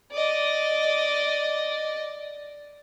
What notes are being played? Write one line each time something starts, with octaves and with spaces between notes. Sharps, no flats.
D5 D#5